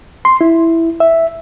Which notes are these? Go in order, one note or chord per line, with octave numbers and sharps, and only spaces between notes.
C6
E4
E5